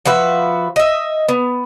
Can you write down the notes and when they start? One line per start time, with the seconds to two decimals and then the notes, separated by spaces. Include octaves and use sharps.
0.06 F3 F#4 B4 E5
0.76 D#5 E5
1.29 B3